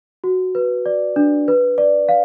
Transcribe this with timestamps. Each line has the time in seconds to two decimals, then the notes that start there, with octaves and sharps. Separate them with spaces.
0.24 F#4
0.55 B4
0.86 D5
1.16 D4
1.48 B4
1.78 D5
2.09 F5